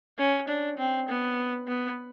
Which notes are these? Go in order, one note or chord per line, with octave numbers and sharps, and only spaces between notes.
C#4
D4
C4
B3
B3